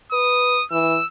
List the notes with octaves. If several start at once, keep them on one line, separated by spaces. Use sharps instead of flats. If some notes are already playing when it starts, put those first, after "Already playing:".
B4 D#6
E3 E6